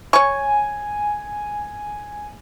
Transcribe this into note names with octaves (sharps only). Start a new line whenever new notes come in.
C#5 G#5 C#6